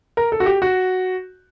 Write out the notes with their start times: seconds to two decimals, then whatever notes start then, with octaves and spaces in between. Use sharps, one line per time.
0.17 A#4
0.32 A4
0.40 F#4
0.46 G4
0.62 F#4